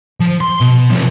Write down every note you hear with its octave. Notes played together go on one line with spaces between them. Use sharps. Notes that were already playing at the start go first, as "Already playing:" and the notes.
F3
C6
B2
F2 C3